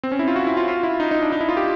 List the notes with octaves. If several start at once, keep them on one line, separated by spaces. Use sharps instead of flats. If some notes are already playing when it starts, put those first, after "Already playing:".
C4
C#4
E4
F4
F#4
E4
F4
F4
E4
D#4
D#4
D4
D#4
E4
F4
G4